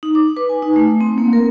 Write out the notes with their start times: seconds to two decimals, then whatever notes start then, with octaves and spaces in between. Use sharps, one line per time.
0.03 D#4
0.15 D6
0.37 B4
0.49 G#5
0.62 D#4
0.76 A3
1.01 C4
1.18 A#3
1.33 A#4